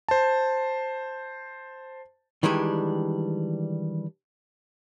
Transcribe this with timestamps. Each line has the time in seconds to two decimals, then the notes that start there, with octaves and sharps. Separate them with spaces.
0.08 C5 A5
2.43 D#3 E3 G3 G#3 D4